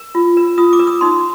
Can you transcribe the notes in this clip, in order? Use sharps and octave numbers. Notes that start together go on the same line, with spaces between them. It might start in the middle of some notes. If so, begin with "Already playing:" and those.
Already playing: A#4
F4
A#4
F4 D#6
D6
A#4
D#6
D#4 C6